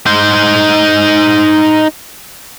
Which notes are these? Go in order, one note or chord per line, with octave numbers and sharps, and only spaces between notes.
D#4 C5